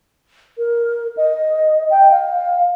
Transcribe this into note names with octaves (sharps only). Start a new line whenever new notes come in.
A#4
D#5
G5
F5